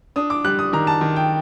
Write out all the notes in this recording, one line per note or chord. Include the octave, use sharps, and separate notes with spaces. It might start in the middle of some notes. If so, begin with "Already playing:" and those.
D4 D#6
D6
G3 F#6
D#6
D#3 A#5
A5
D#3
G5